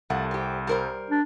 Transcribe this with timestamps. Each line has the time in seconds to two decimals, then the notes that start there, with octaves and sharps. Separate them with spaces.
0.10 C2 F2 A3 F#5
0.31 C4 G4
0.67 G3 A#4 C5
1.10 D4